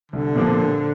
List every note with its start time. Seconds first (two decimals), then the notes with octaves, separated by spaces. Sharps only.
0.12 C2 D3
0.35 A#2 F3 A#3 D4